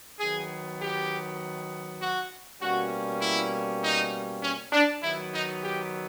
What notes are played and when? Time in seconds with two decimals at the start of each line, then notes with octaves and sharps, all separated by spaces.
0.20 D#3 F#3 B3 G#4
0.81 G4
2.01 F#4
2.61 B2 G3 A#3 C#4 F#4
3.22 E4
3.83 D#4
4.43 C#4
4.72 D4
5.03 D#3 F#3 B3 E4
5.33 D#4
5.63 G4